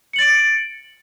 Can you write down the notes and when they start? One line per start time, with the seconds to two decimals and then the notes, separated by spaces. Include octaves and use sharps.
0.13 C#7
0.16 F#7
0.19 A6
0.21 D7